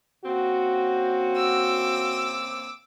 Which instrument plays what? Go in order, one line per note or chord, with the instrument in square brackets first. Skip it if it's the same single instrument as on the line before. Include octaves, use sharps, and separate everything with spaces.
[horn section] C#3 A#3 C4 [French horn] F#4
[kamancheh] D6 E6